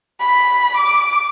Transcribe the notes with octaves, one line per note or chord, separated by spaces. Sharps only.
B5
D6